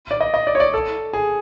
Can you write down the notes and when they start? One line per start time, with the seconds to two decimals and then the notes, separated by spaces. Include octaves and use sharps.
0.11 D5
0.21 D#5
0.34 D#5
0.47 D5
0.55 C#5
0.60 D5
0.74 A4
1.13 G#4